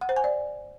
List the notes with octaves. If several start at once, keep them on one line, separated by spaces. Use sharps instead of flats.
F#5
C5
G#5
D5